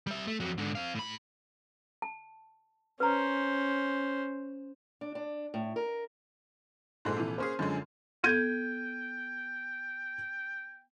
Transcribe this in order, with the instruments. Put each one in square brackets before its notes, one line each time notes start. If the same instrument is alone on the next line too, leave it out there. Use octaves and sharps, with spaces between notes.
[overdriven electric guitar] G3 E5
A3
F2 F#3
G#2 D3
C4 F5
A2 B5
[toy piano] A5
[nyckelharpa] C#4 C5 [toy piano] B4 A#5
[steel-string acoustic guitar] D4
D4
A2
A#4
[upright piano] A#1 A4 F#6 [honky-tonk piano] G#2 G#3 C4
[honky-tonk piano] C3 E3
[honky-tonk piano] A#3 C#4 G#4 [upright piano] C5 F6
[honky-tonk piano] F#2 F3 G#3 [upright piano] D3 C#4
[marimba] B3 A4 [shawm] G5 [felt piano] G6 G#6 D#7